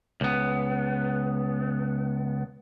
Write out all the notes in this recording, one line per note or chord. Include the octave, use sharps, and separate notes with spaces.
C#2 B3